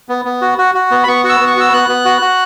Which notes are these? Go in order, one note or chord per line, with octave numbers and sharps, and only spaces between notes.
B3
B3
F#4
F#4
F#4
B3
B5
B3 C#6
F#4 C#6
E6
B3
C#6
F#4 E6
B3 F#6
B3
F#4
F#4